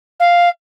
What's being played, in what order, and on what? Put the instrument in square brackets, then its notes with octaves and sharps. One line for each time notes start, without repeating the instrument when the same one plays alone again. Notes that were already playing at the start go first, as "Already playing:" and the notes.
[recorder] F5